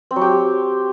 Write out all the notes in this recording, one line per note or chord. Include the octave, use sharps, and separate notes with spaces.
C4
F#3
G4